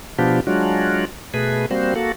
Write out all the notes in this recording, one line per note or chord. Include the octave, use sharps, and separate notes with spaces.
B2 F3 B3 D4 F4 G4
F#3 G#3 D4 F4 F#4
B2 A3 G#4 B4
G3 A#3 C4 F#4 C5
A#3 F#4 A4